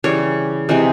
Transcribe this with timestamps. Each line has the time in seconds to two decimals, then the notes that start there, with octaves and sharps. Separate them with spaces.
0.04 C#3 E3 G3 C#5
0.69 C3 E3 G#3